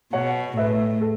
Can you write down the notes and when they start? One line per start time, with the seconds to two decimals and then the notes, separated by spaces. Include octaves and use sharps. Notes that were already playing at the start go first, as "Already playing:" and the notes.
0.13 B2 C#5 F#5
0.57 A2 B4 E5
1.01 A4